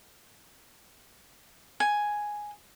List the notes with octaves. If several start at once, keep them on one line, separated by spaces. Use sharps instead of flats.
G#5